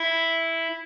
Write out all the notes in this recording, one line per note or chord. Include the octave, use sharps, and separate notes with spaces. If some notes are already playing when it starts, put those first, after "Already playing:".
Already playing: E4